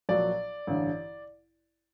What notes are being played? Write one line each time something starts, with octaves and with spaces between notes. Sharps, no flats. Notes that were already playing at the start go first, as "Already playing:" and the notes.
A#1 A#2 F#3 D5
A1 G2 D3